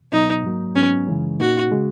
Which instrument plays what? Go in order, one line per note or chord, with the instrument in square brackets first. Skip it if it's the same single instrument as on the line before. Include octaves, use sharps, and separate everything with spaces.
[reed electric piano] C#2 B2 F#3 B3 [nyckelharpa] D#4
[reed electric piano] G#2 F#3 A#3
[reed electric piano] G#2 F#3 B3 [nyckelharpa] C#4
[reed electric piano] F#2 C#3 E3 G#3 C#4
[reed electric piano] A#2 A#3 D#4 [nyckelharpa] F#4
[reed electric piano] C#3 G#3